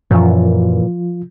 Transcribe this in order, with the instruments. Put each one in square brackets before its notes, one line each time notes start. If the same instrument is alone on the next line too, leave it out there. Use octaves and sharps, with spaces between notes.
[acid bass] F#2 [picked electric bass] A#2 E3 [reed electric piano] F3 F4